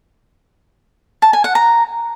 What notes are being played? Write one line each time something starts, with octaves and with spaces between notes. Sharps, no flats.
A5
G#5
F#5
A#5